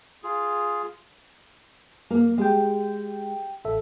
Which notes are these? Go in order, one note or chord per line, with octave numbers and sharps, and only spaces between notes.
F4 G#4
F#2 A#3
G#3 G4 G5
A1 A4 E5